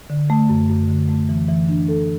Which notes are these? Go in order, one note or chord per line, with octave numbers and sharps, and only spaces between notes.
D3
A3
F#2
F#2
D3
A3
E3
E3
D4
A4